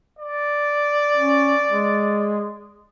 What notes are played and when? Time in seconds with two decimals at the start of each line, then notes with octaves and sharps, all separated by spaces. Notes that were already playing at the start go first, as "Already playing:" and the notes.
0.19 D5
1.16 C#4
1.71 G#3